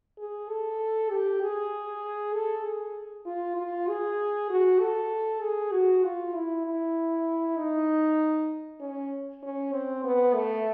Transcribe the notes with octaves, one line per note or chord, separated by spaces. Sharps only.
G#4
A4
G4
G#4
A4
G#4
F4
F4
G#4
F#4
A4
G#4
F#4
F4
E4
E4
D#4
C#4
C#4
C4
B3
A3